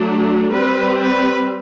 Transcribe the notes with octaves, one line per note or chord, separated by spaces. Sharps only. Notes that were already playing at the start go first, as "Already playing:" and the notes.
Already playing: F#3 A3 D4
G3 C4 B4
B4